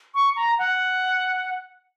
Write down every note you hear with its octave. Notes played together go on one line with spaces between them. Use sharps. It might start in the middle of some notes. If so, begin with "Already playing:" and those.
C#6
A#5
F#5